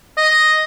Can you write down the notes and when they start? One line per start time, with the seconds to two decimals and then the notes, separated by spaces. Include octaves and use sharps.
0.18 D#5